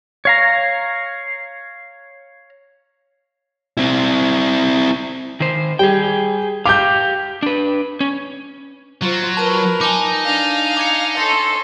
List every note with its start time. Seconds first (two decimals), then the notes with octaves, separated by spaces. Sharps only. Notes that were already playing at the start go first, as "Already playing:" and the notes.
0.25 C#5 F5 A#5
3.77 C4 E4
5.40 D#3 C5
5.79 G3 G#4 G5
6.66 G4 F5 D6 G6
7.43 D4 B4
8.00 C#4
9.02 F#3 F4 C5
9.37 A#4 B4 A5 A#6 D#7
9.81 D#4 G#5 A5 D6
10.25 D4 F5
10.77 D6 G#6 C#7
11.17 A4 C#5 C6 A6 A#6 C7